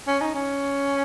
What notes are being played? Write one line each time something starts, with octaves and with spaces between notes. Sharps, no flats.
C#4
D#4
C#4